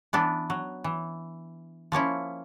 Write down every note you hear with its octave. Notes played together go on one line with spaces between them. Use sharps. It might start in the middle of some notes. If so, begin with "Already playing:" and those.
E3 B3 D4
F#3
E3
F3 A#3 C#4 E4